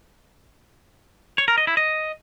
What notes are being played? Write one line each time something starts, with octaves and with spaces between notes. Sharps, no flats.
C#5
A#4
D#5
E4
D#5